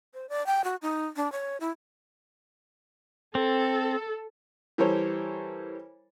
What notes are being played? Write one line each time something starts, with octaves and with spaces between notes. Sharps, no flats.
C5
D5
G5
F#4
D#4
D4
C#5
E4
C4 A4
E3 G3 A4 A#4 C5 C#5